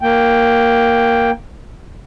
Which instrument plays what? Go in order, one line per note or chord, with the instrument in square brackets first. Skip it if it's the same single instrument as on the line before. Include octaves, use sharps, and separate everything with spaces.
[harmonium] A#3 G5